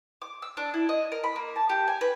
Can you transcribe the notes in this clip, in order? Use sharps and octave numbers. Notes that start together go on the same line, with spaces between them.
D6
E6
D4
E4
D#5
A#4
B5
A#3
A5
G4
G#5
B4